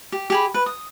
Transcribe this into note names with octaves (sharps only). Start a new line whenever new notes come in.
G4
G4 G#4 B5
B4
D#6